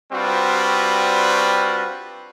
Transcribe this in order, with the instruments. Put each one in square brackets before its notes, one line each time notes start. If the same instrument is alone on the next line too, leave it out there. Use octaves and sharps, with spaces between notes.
[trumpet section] G3 C4 D4 F4 F#4 B4